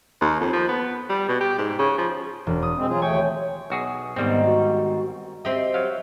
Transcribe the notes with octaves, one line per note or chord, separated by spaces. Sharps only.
D#2
F2
F3
B3
G3
B2
G4
G#2
C#3
F3
E1
D#6
G#3 C4
F#3 F4 G#4
D#2 A3 C#5 G5 G#5
B1 F#4 G#4
G1 G#2 D#3 G3 B3 C4
F#4
C4 G4 D#5 E5
F#3 F5